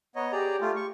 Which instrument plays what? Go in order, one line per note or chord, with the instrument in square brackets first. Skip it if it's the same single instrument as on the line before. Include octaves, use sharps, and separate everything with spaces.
[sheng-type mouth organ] B3 C#5 D#5 [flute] A#5
[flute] G4 [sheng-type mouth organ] G#4 D5 A#5
[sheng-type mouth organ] A3 F4
C#6